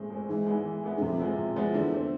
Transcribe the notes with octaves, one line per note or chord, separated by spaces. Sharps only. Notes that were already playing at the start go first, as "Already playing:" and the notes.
Already playing: A2 G#3 C4
G#3 C4
G#2 E3
G#3 B3 E4
E3
G#3 B3 E4
G#2
F2 C3
F3 G#3 B3 E4
C3
F3 G#3 B3 E4
E2 D3
A3 C4